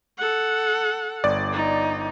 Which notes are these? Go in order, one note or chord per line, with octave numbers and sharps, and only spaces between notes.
A4 F#5
G1 D5
D#4